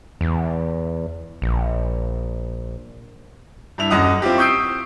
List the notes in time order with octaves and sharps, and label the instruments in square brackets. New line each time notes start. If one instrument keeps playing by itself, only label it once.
[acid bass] E2
A#1
[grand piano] G2 E4 F7
D#1 F#2 D#5 F#5 D#6
C4 E4 F4 G4
C#6 D#6 E6 G6 C7 D7